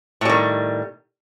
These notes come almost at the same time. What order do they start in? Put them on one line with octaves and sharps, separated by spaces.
A2 G3 D#3